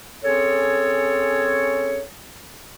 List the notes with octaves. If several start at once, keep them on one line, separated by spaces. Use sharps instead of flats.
C4 C#4 G#4 A4 C#5